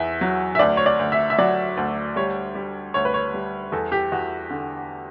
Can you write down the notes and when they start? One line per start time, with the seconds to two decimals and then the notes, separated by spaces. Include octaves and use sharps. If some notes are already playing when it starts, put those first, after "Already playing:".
Already playing: E2 E5
0.21 F#3
0.55 E5
0.59 D2 D5
0.77 C#5
0.86 D5
0.99 D2
1.12 E5
1.30 E5
1.38 F#3 D5
1.77 D2
2.16 G3 C#5
2.55 G3
2.94 D2 C#5
3.05 B4
3.14 C#5
3.34 G3
3.72 E2 A4
3.92 G4
4.12 E2 F#4
4.51 D3